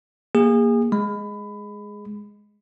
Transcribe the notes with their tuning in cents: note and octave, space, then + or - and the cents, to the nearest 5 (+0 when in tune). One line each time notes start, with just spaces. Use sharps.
A#3 +0 G#4 -30
G#3 +0 B5 +20